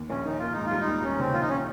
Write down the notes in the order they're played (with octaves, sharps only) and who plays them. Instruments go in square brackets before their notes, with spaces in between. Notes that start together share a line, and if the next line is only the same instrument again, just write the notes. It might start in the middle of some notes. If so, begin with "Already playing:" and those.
Already playing: [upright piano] D#2
[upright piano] A#1 [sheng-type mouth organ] C#4
[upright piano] D#3 [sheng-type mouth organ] D#4
[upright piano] A#3 [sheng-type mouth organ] F4
[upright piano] G#2 [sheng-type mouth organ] D#4
[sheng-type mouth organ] F4
[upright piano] G3
[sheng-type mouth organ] D#4
[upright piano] D#2
[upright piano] G3 [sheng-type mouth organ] C#4
[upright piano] C#3 [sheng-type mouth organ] C4
[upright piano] A#1 [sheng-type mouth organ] F4
[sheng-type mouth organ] D#4
C#4